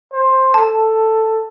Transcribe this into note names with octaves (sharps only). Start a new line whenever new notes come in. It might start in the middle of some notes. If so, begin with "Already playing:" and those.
C5
A4 A5